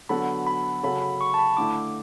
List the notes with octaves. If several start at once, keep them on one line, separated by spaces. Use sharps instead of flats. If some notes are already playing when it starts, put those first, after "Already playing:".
D3 F#3 B3 F#4 A4 B5
B5
C#3 F#3 C#4 F#4 A4 B5
B5
C#6
A5
B5
D3 A3 E4 D6